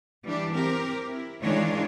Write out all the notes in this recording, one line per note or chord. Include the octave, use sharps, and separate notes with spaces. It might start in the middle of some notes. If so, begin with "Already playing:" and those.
E3 G3 D4 G4
C4 G4 A#4
E4
D#3 E3 G#3 D4 F4 C#5